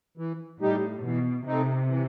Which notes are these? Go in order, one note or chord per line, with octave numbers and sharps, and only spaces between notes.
E3
A2 G3 D#4 G4
B2 E3
C3 A3 C4 D#4
E3